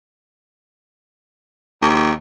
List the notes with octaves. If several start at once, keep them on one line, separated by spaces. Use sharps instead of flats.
D#2